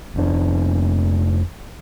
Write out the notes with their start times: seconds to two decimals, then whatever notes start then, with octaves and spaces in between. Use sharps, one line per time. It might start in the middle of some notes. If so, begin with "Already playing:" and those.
0.15 F1 D4